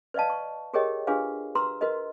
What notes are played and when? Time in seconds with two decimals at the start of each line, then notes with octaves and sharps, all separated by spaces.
0.14 B4 D5 D#5 F5 A5
0.30 C#6
0.73 G4 G#4 A#4 C#5 D#5 G5
1.07 D4 F4 G4 G#4 B4 F5
1.55 F#4 B4 A#5 C6 E6
1.81 F#4 A#4 B4 D#5